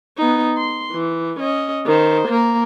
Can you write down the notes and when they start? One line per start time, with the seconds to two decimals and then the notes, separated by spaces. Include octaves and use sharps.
0.17 B3 D#4
0.57 C6
0.92 E3
1.40 C#4 D#5
1.86 D#3 C5
2.28 A#3 A#4